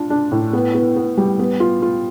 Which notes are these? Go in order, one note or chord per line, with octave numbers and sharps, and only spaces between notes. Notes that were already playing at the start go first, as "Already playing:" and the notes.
Already playing: D4 F4
D4
A2
B3
B3
B3
G3
B3
F4
F4